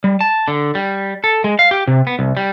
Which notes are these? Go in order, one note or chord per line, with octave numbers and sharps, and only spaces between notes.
G3
A5
D3
G3
A4
G#3
F5
G4
C3
B3
C2
G3